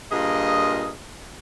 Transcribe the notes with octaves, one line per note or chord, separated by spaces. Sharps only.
G2 A#2 F4 G#4 A#4 D#5